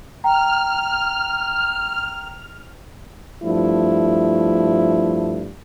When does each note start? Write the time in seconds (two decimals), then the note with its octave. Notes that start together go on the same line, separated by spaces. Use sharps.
0.24 G5 A#5 F6
3.44 G2 F3 A3 E4